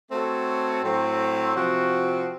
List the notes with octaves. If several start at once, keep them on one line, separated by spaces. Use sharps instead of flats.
A3 C4 F#4 A4 C#5
A2 F#3 C4
C3 F3 C4 F#4